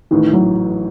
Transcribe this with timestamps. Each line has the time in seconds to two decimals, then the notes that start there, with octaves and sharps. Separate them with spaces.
0.11 A1 A2 D#3 E3
0.33 F#3